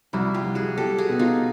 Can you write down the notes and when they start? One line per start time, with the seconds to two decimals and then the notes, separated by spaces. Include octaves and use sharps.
0.13 C2 E4 F#4
0.34 F4 G4
0.45 C2
0.55 F#4 G#4
0.77 G3 G4 A4
0.98 F#4 G#4
1.09 B2
1.19 D#4 F4